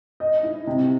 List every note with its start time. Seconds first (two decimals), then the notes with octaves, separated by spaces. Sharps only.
0.20 D#5
0.43 E4
0.67 C3